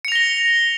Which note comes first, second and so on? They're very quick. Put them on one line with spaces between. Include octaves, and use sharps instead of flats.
C#7 F7 A#6 G7